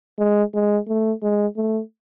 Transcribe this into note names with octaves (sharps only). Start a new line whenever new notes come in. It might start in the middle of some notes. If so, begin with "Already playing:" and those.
G#3
G#3
A3
G#3
A3